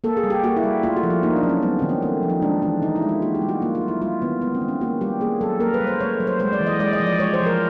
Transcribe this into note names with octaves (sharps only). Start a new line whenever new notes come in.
A#3 A4
G#4
G3
G4
A#3 F#4
E4
G3
A3 F4
F#4
F3
E4
A#3 D#4
D4
F#3
C#4
G3 B3
D#3 C4
C#4
A3 C4
F3
D#4
G#3 D4
E3 D4
D#3 D#4
E4
G#3
F4
A#3 F#4
G4
G3
F#4
A#3 F4
F4
F#3
E4
G3 F4
D#3 B3
G#3 B3
C4
D#3
C#4
A#3 F#4
G3 G4
A#3 G#4
F#3 A4
A#3 A#4
B4
G3
C5
A3 C#5
F#3
C5
G#3 C5
D5
E3
D#5
G#3 D5
D#5
F3
D5
G#3 C#5
C5
F3
A#4